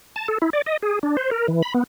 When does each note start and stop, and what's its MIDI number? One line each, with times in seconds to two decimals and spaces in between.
0.16 0.28 81
0.28 0.38 69
0.42 0.50 64
0.53 0.62 74
0.66 0.77 75
0.82 0.99 68
1.03 1.17 62
1.17 1.30 72
1.31 1.47 70
1.48 1.62 52
1.62 1.73 83
1.74 1.84 59